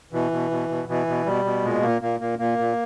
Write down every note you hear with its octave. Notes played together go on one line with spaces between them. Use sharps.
B2 E3
B2
B2
B2
B2 E3
B2
B2 G3
B2
A#2 G#3
A#2 A#3
A#2 A#3
A#2 A#3
A#2 A#3
A#2